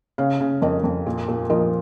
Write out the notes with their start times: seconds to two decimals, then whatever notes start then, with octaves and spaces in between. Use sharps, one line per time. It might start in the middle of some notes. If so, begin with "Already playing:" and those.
0.18 C#3 C#5 F5
0.40 C#3
0.62 F2 A#4 D#5
0.84 F2
1.06 A#2
1.28 A#2
1.50 F3 A#4 D#5